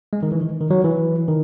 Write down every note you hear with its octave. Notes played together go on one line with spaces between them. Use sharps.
G#3
D#3
E3
D#3
D#3
F#3
E3
D#3